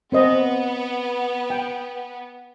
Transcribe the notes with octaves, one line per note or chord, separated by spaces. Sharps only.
B3 C4 C5 D#5
G5